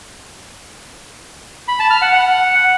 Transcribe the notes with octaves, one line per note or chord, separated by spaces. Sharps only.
B5
A5
F6
F#5
F#5